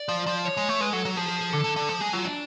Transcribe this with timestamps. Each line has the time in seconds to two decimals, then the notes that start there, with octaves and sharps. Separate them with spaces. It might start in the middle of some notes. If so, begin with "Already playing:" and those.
Already playing: D5
0.09 F3
0.27 F3
0.45 C#5
0.57 G#3
0.69 A3
0.81 G#3 B4
0.93 F#3 A4
1.05 F#3
1.17 F3 G#4
1.28 G#4
1.41 G#4
1.53 D3 A4
1.64 D3
1.76 D3
1.89 F3
2.01 G#3 G#4
2.13 F#3 F4
2.25 D4